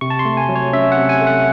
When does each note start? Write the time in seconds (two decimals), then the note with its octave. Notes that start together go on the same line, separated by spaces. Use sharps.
0.01 C3 C#6
0.10 A5
0.19 C6
0.25 A3
0.37 G#5
0.49 F#3
0.55 C#5
0.73 C#4 E5
0.92 F#5
0.97 C3
1.09 G#5
1.21 A3
1.27 F#5